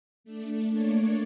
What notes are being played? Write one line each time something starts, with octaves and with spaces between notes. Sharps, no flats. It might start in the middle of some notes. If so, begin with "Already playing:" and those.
A3 D4
A3 A#3 D4 C#5 D5